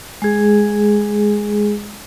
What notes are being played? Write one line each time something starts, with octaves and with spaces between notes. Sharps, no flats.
G#3 G#4